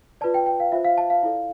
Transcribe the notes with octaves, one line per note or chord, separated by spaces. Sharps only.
F4 B4 D5 A5
G5
G5
F5
F4 C5 E5
F5
A5
F5
E4 A4 D5